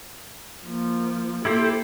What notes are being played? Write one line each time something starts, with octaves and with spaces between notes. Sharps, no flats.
F3 A#3
A#3 E4 G4 A4 C5